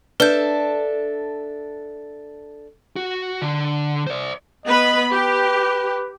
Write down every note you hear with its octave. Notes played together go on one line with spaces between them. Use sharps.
D4 A4 B4 E5 G6
F#4
D3
C5 D5
B3 B4 D#5 B5
G4 B4